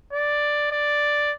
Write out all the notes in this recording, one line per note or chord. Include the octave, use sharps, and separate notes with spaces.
D5
D5